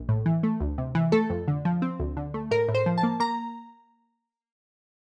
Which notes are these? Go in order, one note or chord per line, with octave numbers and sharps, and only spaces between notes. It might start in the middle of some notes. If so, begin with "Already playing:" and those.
Already playing: A#1
A2
E3
A3
D2
C3
E3
A3 A4
F2
D3
F3
C4
D2
D3
A3
A2 A#4
A2
C5
F3
A5
A#3
A#3 A#5